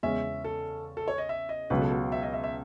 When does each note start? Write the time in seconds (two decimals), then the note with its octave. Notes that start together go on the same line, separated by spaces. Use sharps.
0.03 E2 C#3 G#3 C#4 E5
0.44 A4
0.97 A4
1.08 C#5
1.18 D#5
1.29 E5
1.49 D#5
1.70 C#2 B2 F#3 B3 B4
1.81 A4
1.91 F#4
2.02 F#4
2.12 E5
2.23 D#5
2.33 E5
2.44 E5